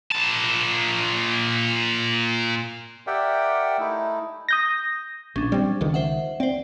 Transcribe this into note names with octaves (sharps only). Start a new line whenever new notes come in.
A#2 A5
G4 A#4 D5 E5 F#5 G5
A3 D#4 E4
D#6 G6 A#6
A#1 C#4 D4
G3 C4
C#2 D#3
C5 E5 F#5
C4 C5 D5